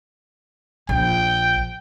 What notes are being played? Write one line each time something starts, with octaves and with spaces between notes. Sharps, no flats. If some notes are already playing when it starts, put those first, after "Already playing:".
A#1 G5